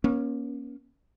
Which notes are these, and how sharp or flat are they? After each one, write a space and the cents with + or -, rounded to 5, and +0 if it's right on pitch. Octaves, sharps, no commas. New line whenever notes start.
A#3 +35 C#4 +0